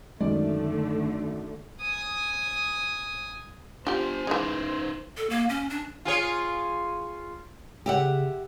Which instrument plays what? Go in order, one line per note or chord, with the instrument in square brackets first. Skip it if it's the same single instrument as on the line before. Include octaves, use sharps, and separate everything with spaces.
[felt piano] F#2 D#3 D5 [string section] D3 A3 [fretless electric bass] G#3
[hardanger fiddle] G#5 D#6
[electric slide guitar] D4 G#5 [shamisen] F4 G4 [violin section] C5
[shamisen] E3 G#3 [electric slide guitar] C#4 D#4 B4
[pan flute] A4
A#3
C#4
D4
[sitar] F4 G#4 C#5
[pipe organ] C#3 [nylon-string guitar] G4 E5 F#5